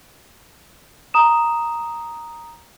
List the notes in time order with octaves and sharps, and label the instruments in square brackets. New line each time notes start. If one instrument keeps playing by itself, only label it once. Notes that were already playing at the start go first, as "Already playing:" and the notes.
[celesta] A#5 D#6 E7